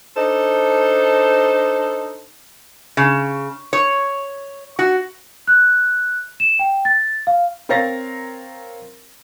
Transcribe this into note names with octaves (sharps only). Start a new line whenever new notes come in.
D4 D#4 A4 C5
C#3
C#5
F#4
F#6
E7
G5
A6
F5
C4 A#4 C#5 F5 A6 A#6